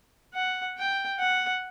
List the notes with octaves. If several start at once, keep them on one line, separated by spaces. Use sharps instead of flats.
F#5
G5
F#5